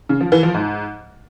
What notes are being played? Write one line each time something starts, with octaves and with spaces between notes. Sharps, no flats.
C#3
F3
E3
F3
G#2